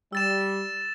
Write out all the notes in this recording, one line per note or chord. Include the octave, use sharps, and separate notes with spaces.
G3 E6 A6 E7